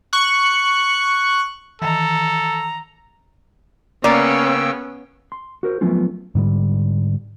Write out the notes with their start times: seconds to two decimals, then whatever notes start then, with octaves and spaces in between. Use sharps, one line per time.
0.13 C#6 F#6
1.82 D#3 E3 A4 A#5
4.04 C#3 A#3 B3 C#4 D5 G5 E6
5.32 C6
5.63 F#4 A#4 C5
5.81 F3 F#3 A3 B3 C#4 F4
6.35 G#2 D3 G3